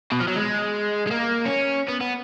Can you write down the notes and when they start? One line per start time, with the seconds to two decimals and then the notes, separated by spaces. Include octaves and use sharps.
0.12 B2
0.20 F3
0.28 F#3
0.36 G#3
1.07 G#3
1.11 A#3
1.45 C#4
1.88 B3
2.00 B3